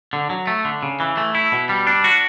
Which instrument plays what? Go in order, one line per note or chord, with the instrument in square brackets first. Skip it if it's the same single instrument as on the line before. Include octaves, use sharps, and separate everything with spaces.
[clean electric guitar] D3
F#3
A3
D3
C#3
E3
A3
E4
B2
G3
D4
F#4